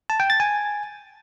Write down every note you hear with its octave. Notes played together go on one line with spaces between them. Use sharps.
A5
G5
A6
G#5